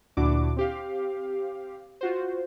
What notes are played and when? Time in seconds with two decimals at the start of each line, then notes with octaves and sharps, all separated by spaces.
0.17 D2 A#2 D4 E4 F#4 D6
0.56 C4 G4 F5
2.01 F4 F#4 C5